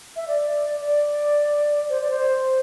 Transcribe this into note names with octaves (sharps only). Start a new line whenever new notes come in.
E5
D5
D5
C5
D5
C5